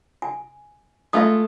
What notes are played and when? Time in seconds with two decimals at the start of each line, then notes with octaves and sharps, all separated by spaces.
0.22 G#5
1.13 G#3 A3 F4 E5 D#6